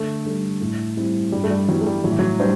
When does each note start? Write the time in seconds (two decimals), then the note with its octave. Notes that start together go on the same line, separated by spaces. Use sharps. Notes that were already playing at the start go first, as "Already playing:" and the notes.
Already playing: D3 A3
0.25 G3 D4 A4
0.61 A2
0.97 G3 C4 E4
1.32 G2 G3
1.44 A3
1.50 G3
1.68 E3 F#3 G3 B3 E4
1.81 A3
1.86 G3
2.04 A2 F#3
2.12 E3
2.19 F#3
2.39 G3 D4 C5